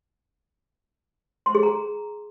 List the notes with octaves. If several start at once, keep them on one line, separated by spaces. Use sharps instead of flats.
C6
G#4
A#5